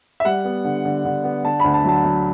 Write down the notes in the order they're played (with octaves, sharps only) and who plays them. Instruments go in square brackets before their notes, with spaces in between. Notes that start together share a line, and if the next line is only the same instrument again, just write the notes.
[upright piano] E5
G3 F#5
B3
D3
D3
D3
B3
D3 A5
D2 B5
A5
F#3 A5
F#3